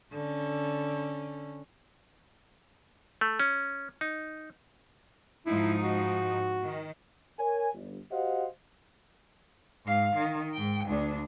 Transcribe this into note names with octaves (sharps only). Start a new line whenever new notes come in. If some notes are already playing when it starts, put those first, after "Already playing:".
D3 C#4
A3
C#4
D#4
G#2 F3 D#4 E4
F#4
D#3
A#4 C#5 G#5
G1
F#4 G4 C5 D#5 F5 F#5
G#2 F5
D#3
G#2 G5
D2 D4